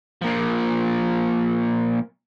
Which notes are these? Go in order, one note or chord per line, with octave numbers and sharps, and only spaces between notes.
A#2 F3